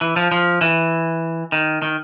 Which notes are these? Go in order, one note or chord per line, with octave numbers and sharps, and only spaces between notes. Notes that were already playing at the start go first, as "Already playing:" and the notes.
E3
F3
F3
E3
D#3
D#3